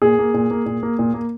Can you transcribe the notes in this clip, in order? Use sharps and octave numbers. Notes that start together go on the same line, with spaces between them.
A#2 G#4
A#3
A#2
A#3
A#2
A#3
A#2
A#3